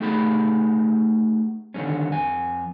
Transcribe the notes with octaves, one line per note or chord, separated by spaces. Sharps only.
A3 D#4 G4 G#4 B5
D3 D#3 F#3 G3 C#4
F2 G#5